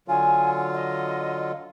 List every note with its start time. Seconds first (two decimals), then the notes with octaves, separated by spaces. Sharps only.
0.08 D3 F#3 F4 G#5
0.73 D#5